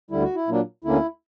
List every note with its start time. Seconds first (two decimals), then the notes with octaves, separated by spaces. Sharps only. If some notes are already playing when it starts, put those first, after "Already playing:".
0.11 D2 D3 G3 E4
0.23 F#4
0.35 E4
0.47 A#2 F#3 A#3 D4
0.84 D2 D3 A#3 C#4 E4